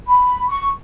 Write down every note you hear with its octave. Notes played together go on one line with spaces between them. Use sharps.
B5
C#6